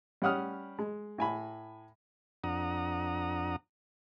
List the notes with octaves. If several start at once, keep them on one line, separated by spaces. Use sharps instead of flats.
G3 C#4 F#5 D#6 F6
G#3
A2 G#5 B5
F2 D4 F#5 A#5 D#6